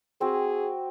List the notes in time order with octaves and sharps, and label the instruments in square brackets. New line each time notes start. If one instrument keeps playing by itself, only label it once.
[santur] C4 F#4 [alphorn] G#4